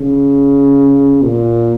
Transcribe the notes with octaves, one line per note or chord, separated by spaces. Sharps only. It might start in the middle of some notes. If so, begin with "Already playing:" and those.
Already playing: C#3
A#2